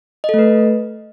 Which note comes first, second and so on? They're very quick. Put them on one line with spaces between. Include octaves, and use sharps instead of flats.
D#5 A4 A3 B4